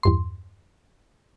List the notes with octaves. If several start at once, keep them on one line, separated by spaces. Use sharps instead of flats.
E2 G2 C6